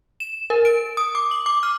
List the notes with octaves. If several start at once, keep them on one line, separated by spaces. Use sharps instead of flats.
E7
A#4
D7
D#6
D6
F#7
D6
F6